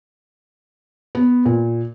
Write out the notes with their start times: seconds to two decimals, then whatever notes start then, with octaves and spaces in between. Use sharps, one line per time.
1.15 B3
1.46 A#2